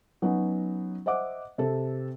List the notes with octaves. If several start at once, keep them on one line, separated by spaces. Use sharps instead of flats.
F#3 B3 C#4 D#4
C5 D#5 E5 F#5 D6
C3 G4 A4